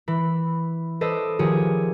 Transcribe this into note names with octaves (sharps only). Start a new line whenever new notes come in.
E3 B5
A4 B4 C5 D5 D#5 E6
D#3 F3 G4 G#4 C#5